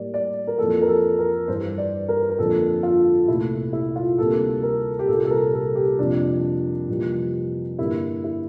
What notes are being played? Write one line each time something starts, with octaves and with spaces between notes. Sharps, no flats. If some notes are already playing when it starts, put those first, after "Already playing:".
Already playing: A2 G3 A#3 D5
D5
A#4
F2 E3 A#3 A4
A#4
A4
A#4
G2 E3 G3 C5
D5
A#4
A#4
F2 D3 F3 A#3 A4
F4
C2 A#2 A3 E4
E4
F4
D2 C3 G3 A#3 A4
A#4
G4
C2 A#2 G3 A#3 A4
A4
A#4
A4
G4
F2 C3 G3 A#3 D4
F2 C3 E3 G3 A#3
G2 D3 G3 A#3 E4
E4